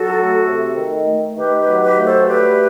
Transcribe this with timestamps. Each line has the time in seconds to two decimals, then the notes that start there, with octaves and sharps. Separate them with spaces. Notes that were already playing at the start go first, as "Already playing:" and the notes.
Already playing: F#3 F#4 A4
0.16 A3
0.45 C3
0.76 D#3
1.06 A3
1.36 D#3 G4 B4
1.59 G4 B4
1.67 F#3
1.82 G4 B4
1.97 A3
2.05 A4 C5
2.27 G3 G4 B4